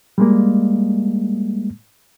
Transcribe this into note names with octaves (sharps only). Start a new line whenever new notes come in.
G3 G#3 A#3